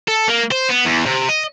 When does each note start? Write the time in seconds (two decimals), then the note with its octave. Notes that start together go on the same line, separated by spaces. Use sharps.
0.08 A4
0.28 A#3
0.51 C5
0.69 B3
0.85 E2
1.06 C3
1.29 D#5